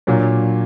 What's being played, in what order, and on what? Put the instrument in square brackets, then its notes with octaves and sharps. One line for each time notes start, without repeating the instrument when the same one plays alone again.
[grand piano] A#2 F#3 A#3 D4